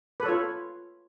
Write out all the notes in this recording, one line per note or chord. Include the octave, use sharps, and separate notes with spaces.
F4 A4 B4 C#5